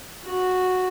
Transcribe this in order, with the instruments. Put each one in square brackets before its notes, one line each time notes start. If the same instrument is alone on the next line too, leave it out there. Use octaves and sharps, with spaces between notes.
[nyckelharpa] F#4